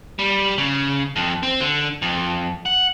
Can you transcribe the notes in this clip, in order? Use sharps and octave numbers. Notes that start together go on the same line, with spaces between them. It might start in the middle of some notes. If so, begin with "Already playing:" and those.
G3
C#3
F2
C4
D3
F2
F#5